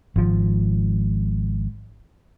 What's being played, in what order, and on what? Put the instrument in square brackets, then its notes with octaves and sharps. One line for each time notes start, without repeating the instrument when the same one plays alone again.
[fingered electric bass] G#1 F3